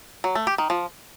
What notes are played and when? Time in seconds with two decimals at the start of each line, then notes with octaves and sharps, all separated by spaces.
0.24 F#3
0.35 A3
0.47 G4
0.58 D#3
0.70 F3